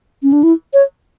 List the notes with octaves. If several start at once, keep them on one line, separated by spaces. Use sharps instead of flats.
C#4
D4
E4
C#5